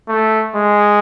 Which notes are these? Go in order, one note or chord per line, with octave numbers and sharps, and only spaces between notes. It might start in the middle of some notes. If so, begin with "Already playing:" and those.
A3
G#3